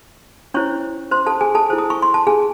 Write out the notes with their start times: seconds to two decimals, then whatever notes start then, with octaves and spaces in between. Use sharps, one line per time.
0.54 C#4 E4 C5 C#5 C#6
1.12 C5 C6
1.26 A4 A5
1.41 G#4 G#5
1.55 A4 A5
1.70 E4 G#4 C5
1.78 D#6
1.90 C#6
2.02 C6
2.14 A5
2.27 G#4 G#5